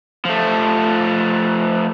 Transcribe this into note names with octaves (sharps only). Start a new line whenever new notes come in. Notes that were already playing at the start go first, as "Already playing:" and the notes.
F3 A3